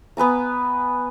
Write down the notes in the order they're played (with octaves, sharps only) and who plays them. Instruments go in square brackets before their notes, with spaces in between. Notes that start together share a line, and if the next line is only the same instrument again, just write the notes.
[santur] B3 B4 G#5 A#5